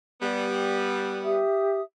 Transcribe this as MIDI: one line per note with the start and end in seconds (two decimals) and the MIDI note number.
0.22 1.40 55
0.22 1.40 59
1.23 1.81 67
1.23 1.81 76
1.23 1.81 87